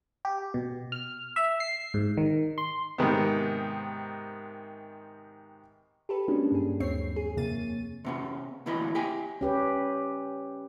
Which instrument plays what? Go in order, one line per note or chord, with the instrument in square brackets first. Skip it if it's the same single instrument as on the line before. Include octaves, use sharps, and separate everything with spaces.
[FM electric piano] G4
B2
F6
E5
C7
G#2
D#3
C6
[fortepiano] G#2 C3 D#3 B3
[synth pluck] G4 A4 B4
F#3 G#3 A#3 C#4 D4
G2 G#4
D#2 C4 C#5 C7
G#4
F2 C3 A#3 A6 D#7
[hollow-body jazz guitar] C3 B3 C#4
D2 A#2 E3 B3 E4 D#5
G4 E5 G5 G#5
[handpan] C#4 G4 B4